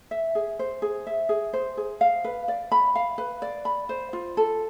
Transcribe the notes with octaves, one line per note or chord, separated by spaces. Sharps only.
E5
G#4
C5
G#4
E5
G#4
C5
G#4
F5
B4
D5
B5
F5
B4
D5
B5
C5
F4
A4